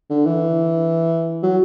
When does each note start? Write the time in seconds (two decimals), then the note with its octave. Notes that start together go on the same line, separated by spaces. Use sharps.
0.10 D3
0.26 E3
1.43 F#3